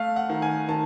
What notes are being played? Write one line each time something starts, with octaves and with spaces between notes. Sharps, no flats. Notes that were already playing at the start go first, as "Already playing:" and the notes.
Already playing: A3 F5
F#5
D#3
G#5
D#3 A5